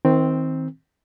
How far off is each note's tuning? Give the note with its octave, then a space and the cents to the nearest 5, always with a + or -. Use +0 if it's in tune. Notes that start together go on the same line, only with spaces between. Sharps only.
D#3 +30 C4 +0